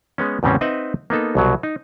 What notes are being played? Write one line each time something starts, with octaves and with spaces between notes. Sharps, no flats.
G#3 B3 C#4
E2 A2 C#3 G3 C4 C#4
C4 D#4 B4 D#5 E5 F#5
A#3 B3 D#4 A4
C2 B2 F#3
D#4